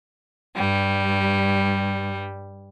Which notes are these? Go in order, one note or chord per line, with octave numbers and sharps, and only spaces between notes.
G2 G3